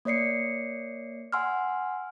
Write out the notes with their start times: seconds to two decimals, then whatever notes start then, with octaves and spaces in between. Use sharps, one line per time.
0.05 A#3 C#5 D5 C7 C#7
1.32 F#5 G#5 C6 E6 F6